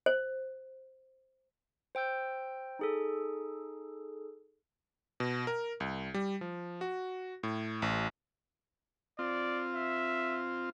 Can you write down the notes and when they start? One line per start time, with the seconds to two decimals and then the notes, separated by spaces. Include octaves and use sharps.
0.06 C5
1.95 C5 G5 E6 G6
2.79 D#4 G#4 A4
5.20 B2
5.47 A#4
5.80 C2
6.14 G3
6.41 F3
6.81 F#4
7.43 A2
7.82 A1
9.19 C4 F4 D5
9.75 E5